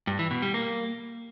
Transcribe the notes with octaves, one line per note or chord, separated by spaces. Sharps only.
G2
E3
B2
G3
A#3